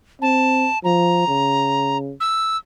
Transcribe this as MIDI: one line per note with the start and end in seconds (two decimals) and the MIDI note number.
0.22 0.69 60
0.22 0.79 81
0.84 1.24 53
0.84 1.97 82
1.28 2.12 49
2.20 2.57 88